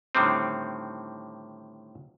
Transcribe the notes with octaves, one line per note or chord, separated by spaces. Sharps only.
A2 D3 D#3 G3 C4